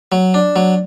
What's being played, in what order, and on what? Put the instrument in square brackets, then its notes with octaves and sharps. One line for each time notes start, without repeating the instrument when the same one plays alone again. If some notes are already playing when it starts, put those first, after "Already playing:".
[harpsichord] F#3
D4
F#3